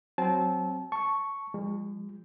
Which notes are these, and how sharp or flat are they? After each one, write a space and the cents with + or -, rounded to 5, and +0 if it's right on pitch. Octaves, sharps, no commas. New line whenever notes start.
F#3 +0 C4 +0 A5 -30
A5 +0 C#6 +0
F3 +0 G#3 -40